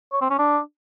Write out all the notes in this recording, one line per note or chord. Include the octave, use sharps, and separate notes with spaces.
C#5
C4
C#4
D4